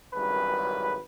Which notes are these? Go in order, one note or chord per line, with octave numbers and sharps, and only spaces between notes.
G#1 F#2 C#3 E3 G3 B4